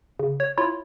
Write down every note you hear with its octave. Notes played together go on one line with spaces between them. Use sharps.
C#3
C#5
E4 F4 C#5